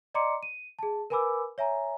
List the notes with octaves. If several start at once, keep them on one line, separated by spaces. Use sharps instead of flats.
D5 D#5 A#5 C6 D6 C#7
D#7
G#4 A5
A#4 B4 G#5 B5 D6 E6
C#5 E5 G#5 A#5